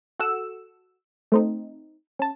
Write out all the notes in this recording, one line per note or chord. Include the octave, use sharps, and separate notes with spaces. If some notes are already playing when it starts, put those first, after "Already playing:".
F#4 A4 F#5 E6
A3 C4 D#4
C#4 A5